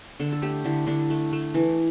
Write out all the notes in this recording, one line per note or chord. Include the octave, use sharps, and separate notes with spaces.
D3 A4
A4
A3 G4
D3 E4
D3 D4
A3
A3
E3